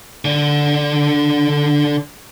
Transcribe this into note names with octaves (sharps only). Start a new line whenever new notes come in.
D3 D4